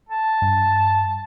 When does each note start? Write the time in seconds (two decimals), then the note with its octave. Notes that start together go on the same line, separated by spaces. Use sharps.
0.09 A5
0.42 G2